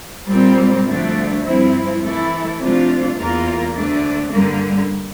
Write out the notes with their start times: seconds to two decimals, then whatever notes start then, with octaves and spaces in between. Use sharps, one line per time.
0.29 A#2 G3 C4
0.87 D2 D3 F3 A3 D4
1.44 G2 F3 C4 E4
2.02 E3 A3 E4 A4
2.59 C3 F3 A3 D4 F4
3.16 E2 E3 A#3 F4 A#4
3.75 D2 D3 A3 D4
4.32 G2 D3 G3 A#3